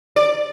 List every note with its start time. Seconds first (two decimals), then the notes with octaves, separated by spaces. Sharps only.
0.16 D5